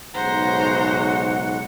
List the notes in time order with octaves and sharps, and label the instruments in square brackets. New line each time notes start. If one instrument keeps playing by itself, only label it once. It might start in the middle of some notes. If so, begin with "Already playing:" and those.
[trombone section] B1 G#2 C#3 [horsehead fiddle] C5 A#5 [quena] F#5